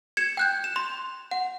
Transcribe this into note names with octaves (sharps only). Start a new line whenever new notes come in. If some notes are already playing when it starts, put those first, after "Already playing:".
G#6 C#7 E7
G5 F#6 G6
E7
C6
F#5